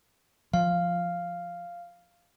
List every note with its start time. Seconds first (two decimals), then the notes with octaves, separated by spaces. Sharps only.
0.54 F3 F5